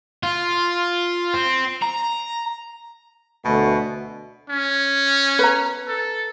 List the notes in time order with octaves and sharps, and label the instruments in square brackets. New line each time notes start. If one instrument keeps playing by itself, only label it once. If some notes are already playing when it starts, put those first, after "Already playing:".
[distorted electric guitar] F4
C4
A#5
[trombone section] D2 A3 [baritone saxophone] B2
[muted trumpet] C#4
[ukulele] B4 A#5
[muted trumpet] A4